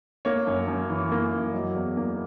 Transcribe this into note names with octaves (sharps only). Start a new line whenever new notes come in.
A#3 C#5
F#2
F#2
E3
A#3
F#2
F#3 D#5
E2
A#3